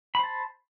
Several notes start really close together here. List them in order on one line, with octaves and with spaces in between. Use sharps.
B5 C5 A5